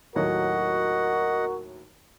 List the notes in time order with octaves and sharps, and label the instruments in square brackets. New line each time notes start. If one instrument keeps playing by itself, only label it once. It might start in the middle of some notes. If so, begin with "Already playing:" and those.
[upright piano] D#2 A2 F#3 [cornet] F#4 [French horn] A#4 [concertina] D#5 F#5